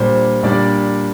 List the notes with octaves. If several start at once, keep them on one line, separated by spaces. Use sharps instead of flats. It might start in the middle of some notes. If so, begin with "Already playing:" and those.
Already playing: A#2 G3 D4 C5
A#2 G3 D4 D5